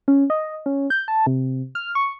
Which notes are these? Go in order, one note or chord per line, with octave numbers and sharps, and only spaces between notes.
C#4
D#5
C#4
G6
A5
C3
F6
C#6